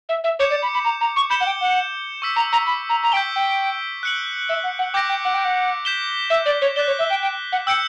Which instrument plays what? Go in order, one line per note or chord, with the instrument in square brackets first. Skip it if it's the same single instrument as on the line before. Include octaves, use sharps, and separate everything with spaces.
[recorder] E5
E5
[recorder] C#5 [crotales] D6 G6 C#7 E7
[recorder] D5
B5
B5
A#5
A#5
C#6
[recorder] B5 [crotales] G6 C#7 E7 G7
[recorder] F#5
G5
F#5
[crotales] C#6 E6 B6
[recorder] A#5
A#5
B5
A#5
A#5
[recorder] G5 [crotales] G6 B6 D7 G7
[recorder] G5
[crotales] F#6 C#7 F#7
[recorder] E5
F#5
F#5
[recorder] G5 [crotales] D6 G6 A#6 D7
[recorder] G5
F#5
G5
F#5
[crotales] G6 B6 E7 G7
[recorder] E5
D5
C#5
[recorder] D5 [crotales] F#6 B6 E7 G7
[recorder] C#5
E5
G5
G5
F#5
[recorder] G5 [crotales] E6 G6 C#7